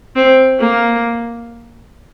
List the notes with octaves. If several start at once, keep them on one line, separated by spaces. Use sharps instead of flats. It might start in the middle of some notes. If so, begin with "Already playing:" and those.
C4
A#3